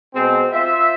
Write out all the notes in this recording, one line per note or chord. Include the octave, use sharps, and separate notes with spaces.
B2 G#3 C4
F4 C5 E5